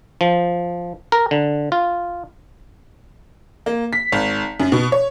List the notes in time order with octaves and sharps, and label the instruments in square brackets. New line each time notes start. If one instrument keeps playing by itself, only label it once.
[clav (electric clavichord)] F3
A#4
D3
F4
[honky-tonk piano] A#3
B6
G#1
F#2
B2
C#5